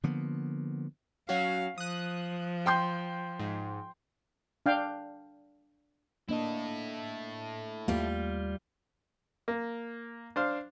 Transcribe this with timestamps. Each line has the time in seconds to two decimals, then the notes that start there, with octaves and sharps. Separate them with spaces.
0.03 D3 F3 A#3 B3
1.29 F#3 C#4 F#4 F5
1.78 F3 D#6 F#6
2.66 G5 C6 G6
3.39 G#2
4.66 D4 F5 G5
6.29 A#3 D4 E4 A4 D#5
7.88 D#2 G3 A3 A#3 F4
9.48 A#3
10.36 D4 C5 F5